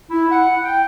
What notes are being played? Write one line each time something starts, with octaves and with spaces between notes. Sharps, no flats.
E4
F#5
G5